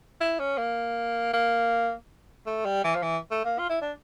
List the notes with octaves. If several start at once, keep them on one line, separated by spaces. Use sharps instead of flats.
E4
C#4
A#3
A#3
A3
G3
E3
F3
E3
A3
A#3
F4
E4
D4